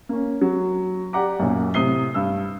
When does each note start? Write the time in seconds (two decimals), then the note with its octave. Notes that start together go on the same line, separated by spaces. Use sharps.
0.09 A#3 C#4
0.41 F#3
1.13 G4 D5 F#5 A#5 D6
1.39 B1 F#2 A#2
1.74 A2 C3 D#6 C7 G7
2.14 G2 E6